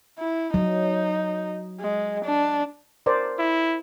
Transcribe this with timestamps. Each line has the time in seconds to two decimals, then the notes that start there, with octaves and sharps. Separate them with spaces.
0.19 E4
0.54 F#3 D#4
1.80 G#3
2.24 D4
3.06 A#4 C5 D5
3.39 E4